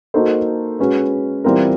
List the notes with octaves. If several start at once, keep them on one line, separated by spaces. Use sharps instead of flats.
A#3 D#4 F#4 A4 C5
G#3 C#4 F#4 B4
E3 G3 C4 F4 A#4